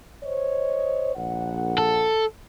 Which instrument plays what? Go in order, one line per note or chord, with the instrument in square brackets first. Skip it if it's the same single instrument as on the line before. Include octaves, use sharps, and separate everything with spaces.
[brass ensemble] C5 C#5 D#5
A#1 F#5
[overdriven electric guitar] A4